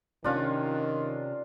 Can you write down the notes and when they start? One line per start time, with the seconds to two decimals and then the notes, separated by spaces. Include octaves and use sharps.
0.24 C3 D#3 C#4 D4 F4 F5